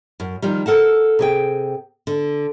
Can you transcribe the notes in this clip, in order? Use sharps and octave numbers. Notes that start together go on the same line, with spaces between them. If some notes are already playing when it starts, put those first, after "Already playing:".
F#2
D#3 F3 G3
A4 A#4 F#5 A5
C3 G#4 G5
D3